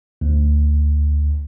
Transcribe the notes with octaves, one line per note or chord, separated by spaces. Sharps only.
D2